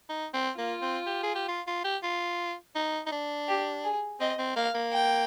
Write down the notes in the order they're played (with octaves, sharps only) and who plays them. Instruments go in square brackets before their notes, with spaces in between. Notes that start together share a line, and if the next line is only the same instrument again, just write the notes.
[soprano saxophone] D#4
C4
[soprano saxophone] A#3 [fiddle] F4
[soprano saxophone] C4
G4
G#4
G4
F4
F4
G4
F4
D#4
D#4
D4
[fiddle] G4
G#4
[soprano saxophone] C4 [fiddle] D#5
[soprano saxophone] C4
[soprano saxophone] A#3 [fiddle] F5
[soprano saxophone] A#3
[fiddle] G5